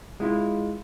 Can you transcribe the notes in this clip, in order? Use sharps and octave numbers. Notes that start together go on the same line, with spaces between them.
G#3 E4 F4